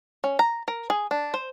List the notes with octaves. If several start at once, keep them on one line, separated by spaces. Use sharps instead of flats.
C#4
A#5
A#4
G#4
D4
C5